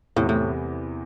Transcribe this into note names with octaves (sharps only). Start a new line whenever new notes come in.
E2 A2 C3 E3
A2